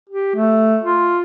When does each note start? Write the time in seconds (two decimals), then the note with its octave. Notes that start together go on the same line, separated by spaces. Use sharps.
0.09 G4
0.36 A3
0.83 F4